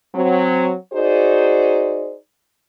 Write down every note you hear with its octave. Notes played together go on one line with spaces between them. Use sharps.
F#3 C4
D#4 F#4 G#4 C5 D5